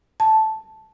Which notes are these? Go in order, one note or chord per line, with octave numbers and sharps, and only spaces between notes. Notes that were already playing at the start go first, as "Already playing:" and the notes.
A5